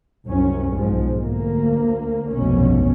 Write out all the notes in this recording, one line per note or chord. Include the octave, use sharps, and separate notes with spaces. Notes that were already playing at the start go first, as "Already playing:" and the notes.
C2 F#2 C#4
B1 G#2 F3 G#3
D2 A#3
F1 B1 G2 B2 C#4